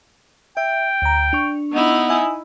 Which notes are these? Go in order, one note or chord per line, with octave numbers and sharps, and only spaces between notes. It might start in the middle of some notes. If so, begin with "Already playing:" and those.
E5 G5
D2 A#5
D4 C#6
B3 D#4 E4
E5 G#5 D#6